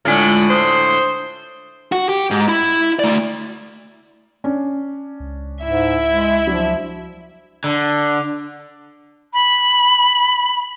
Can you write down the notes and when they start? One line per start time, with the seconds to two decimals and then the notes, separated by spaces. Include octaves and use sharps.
0.05 A2 D3 G#3 F4
0.50 C5 D#6
1.92 F#4
2.09 G4
2.31 G#2
2.48 E4 B5
2.99 A3 D5
4.44 C#4 D4
5.20 C#2
5.64 G#2 E4 E5
6.08 G#3
6.47 F3 F#3 D4
7.64 D3
9.34 B5